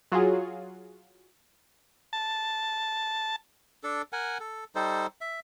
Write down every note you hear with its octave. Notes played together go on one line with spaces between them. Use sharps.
F#3 F4 F#4 G#4
A5
D4 A4
A#4 F#5 G#5
A4
G3 D#4 A4 C5
E5